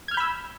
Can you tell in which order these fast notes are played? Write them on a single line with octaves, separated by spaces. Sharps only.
G#6 F6 G6 B5 E6